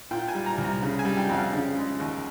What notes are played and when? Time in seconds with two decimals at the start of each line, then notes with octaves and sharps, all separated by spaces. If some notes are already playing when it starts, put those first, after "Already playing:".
0.11 A#2 G5
0.28 G#5
0.35 G3
0.46 A#5
0.58 C2
0.63 A#5
0.82 C#3
0.99 G#5
1.05 G3
1.17 G5
1.29 F2
1.34 F5
1.53 C#3
1.76 G#3
2.00 D#2